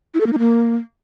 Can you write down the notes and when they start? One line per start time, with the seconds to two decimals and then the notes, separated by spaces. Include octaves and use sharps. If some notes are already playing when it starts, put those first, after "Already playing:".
0.14 E4
0.20 A4
0.26 A#3
0.33 D#4
0.39 A#3